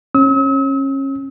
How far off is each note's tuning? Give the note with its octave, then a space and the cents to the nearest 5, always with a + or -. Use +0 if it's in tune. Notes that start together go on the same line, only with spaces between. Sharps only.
C#4 -30 E6 -45